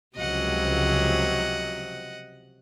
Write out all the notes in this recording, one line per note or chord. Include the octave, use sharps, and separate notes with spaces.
C#2 C3 F3 F#3 D#5 F#5